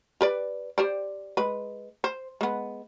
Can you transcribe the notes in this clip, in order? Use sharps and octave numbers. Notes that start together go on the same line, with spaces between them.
G4 B4 D5
G4 C5 D5
G#3 B4
C5
G#3 B3